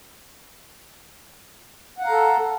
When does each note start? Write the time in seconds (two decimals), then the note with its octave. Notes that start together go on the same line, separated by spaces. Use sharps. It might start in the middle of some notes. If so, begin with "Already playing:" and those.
1.98 F#5
2.02 F5
2.06 A#5
2.10 A4